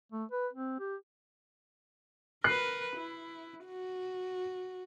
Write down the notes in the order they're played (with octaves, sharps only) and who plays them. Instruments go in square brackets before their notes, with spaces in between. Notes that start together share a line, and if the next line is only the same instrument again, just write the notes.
[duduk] A3
B4
C4
G4
[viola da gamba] A#4 B4 [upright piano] F#6 C7
[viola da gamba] E4
F#4